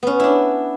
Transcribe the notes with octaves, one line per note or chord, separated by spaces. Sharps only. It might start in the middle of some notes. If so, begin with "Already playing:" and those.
B3 C#4
D4 E4